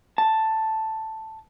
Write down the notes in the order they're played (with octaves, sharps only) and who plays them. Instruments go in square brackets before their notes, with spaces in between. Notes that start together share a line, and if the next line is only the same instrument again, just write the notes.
[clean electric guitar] A5